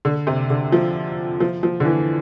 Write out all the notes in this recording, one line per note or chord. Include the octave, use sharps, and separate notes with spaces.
D3
C3
D3
F3
F3
F3
D3
E3